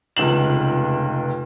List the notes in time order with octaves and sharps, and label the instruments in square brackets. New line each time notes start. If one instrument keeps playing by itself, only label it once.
[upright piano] F1 C#2 E7 F#7